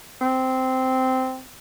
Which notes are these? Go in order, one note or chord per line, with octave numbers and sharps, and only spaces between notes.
C4